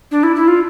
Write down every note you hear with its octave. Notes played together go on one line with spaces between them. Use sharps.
D4
E4
E4
F4